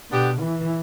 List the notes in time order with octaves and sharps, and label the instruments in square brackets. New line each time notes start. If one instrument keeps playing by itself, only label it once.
[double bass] B2 [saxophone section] D3 B3 D4 G4
[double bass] E3